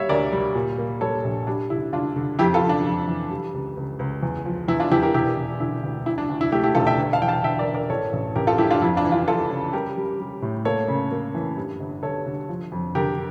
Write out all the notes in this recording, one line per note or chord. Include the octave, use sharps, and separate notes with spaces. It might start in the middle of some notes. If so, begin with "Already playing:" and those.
Already playing: G3 A#3 C#5 E5 F5
D2 A#4 D5
G3
A#2
A#3
G3 A4 C#5
A#1
G3 D4
D3 E4
D3 D4 F4
D3
F2 E4 G4
F4 A4
F2
D4 F4
F2
E3
G3
C#2
C#2
C#2
E2
F3
E2 E4
D4 F4
E2 E4 G4
G4 A#4
E1 E4 G4
E1
D3 E4
D2
D2 E4
D4
D2
E4
A3 E4 G4
E4 G4
E1 F4 A4
E5 G5
G1
F5 A5
E3 G5
F5 A5
G1 E5 G5
A#4 D5
G1
A#4 D5
A1 A4 C#5
A1
A1 G4 A#4
F4 A4
G2 E4 G4
D4 F4
F2 E4
D4 F4
E3
D4 F4
E3 F4 A4
C#3
G3 G4 A#4
G3
G3
A2
A#3 A4 C#5
C#3
A#3
E3
G2
G1
G1 A4 C#5
D3
F3
F2
D3 G4 A#4